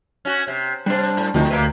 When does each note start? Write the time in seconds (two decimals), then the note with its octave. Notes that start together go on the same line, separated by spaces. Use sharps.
0.25 C#4 F#4
0.47 C3
0.86 C3 G3 D4 C5
1.17 A2
1.34 D2 A2 C3 D#3 F3 D#4
1.50 C3 A#3 B4 C5 D5